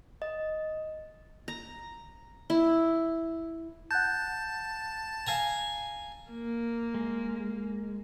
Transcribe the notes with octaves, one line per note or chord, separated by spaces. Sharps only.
D#5
A#5
E4
F#5 A5 F#6 G6
F5 G#5 A#5
A#3
G#3